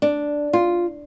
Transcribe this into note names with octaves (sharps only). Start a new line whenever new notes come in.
D4
F4